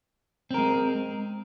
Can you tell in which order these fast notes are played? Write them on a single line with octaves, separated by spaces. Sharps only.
C4 A#4 G#3